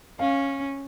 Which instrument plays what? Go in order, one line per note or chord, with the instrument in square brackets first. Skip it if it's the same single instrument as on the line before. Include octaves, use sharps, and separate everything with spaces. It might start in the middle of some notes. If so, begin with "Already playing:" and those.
[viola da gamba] C#4 [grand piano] F5